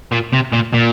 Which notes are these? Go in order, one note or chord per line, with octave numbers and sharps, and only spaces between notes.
A#2
C3
A#2
A#2